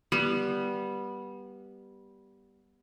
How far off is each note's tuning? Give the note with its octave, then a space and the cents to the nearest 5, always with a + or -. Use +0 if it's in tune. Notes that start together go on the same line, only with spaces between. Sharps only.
G3 +0 B3 -15